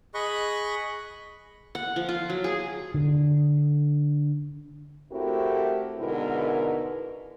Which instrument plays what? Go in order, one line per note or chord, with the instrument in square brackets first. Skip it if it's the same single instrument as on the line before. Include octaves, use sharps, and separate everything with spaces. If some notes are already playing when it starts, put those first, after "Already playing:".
[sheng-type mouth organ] G#4 D#5 B5 C#6 F#6
[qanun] F#5
F3
F4
F#3
G#4
[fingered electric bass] D3
[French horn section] A3 C4 E4 F#4 G4 A#4
G#2 B2 D3 E4 A#4 B4